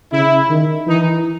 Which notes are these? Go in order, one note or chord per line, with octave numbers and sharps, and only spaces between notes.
C#3 E4
D#3
E3 D#4